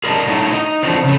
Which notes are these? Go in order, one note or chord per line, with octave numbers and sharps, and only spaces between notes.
G#4 A#4 D5 D#5 A5
F#3 A3 D#4 E4
D#4
E3 F3 C4 D4 F#4 C5
C#3 A3